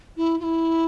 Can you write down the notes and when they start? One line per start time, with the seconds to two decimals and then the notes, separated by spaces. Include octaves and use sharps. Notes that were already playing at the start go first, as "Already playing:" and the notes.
0.17 E4
0.40 F4
0.43 E4